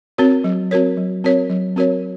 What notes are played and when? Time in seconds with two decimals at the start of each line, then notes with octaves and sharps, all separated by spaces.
0.18 C4 F#4 A#4 C#5
0.44 F#3
0.71 C4 F#4 A#4 C#5
0.97 F#3
1.24 C4 F#4 A#4 C#5
1.50 F#3
1.76 C4 F#4 A#4 C#5